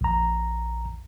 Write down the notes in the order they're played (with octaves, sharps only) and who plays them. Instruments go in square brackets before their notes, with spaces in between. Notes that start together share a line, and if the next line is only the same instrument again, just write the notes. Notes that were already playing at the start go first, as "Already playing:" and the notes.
[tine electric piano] A#1 A#5